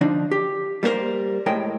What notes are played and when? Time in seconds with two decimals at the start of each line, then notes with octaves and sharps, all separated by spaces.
0.01 D3 F3 D4 D#4
0.31 G4
0.83 G3 A#3 B3 A#4 C5
1.46 A2 G#3 A#4 G5